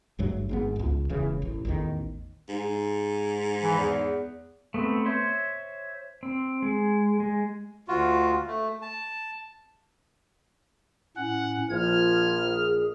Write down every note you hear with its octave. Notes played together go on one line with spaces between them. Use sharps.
G#1 G2 F#3 A3
G#1 G#2 B3
E1 C#2
E1 C#3 E3
A1
A1 E2 D#3
G#2
E3
E2
A3 B3 C4
C5 C#5 E5 C6
C4
G#3
G#3
D2 F4 F#4
A3
A5
A2 C#4 F#5
A#1 F3 F6 G#6
G#4